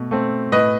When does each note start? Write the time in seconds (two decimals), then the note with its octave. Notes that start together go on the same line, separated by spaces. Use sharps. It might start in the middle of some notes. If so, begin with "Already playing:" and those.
Already playing: B2 A3
0.11 A3 C4
0.52 A2 B4 D#5